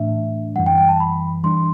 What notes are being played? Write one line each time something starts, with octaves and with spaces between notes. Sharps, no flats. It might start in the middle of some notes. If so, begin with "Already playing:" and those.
Already playing: A2 E3 A3 D4 E5
F#2 E3 G3 F#5
G5
G5
A5
B5
E3 G3 D4 C6